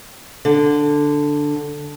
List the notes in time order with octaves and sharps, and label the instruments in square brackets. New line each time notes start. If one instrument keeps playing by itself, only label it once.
[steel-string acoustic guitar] D3